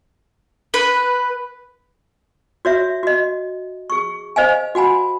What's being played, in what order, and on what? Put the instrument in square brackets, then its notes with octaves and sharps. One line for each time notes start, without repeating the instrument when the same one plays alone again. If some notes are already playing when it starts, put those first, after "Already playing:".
[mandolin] B4
[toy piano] F#4 C#5 E5
F#4 D#5
G#4 C#6
C5 D#5 F5 G#5
F#4 F#5 G#5 B5